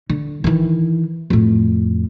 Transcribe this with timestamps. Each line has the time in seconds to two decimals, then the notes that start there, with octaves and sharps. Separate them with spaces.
0.10 D3
0.44 D#3 E3
1.30 F2 A2